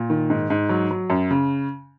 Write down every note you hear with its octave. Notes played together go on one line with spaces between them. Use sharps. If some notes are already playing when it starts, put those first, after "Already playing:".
Already playing: A#2
D#3
G#2
G#2
F#3
F#3
F#2
C#3